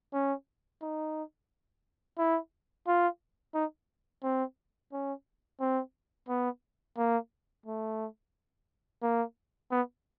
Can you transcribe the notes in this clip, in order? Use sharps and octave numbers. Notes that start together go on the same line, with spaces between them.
C#4
D#4
E4
F4
D#4
C4
C#4
C4
B3
A#3
A3
A#3
B3